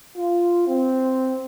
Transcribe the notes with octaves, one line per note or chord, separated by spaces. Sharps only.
F4
C4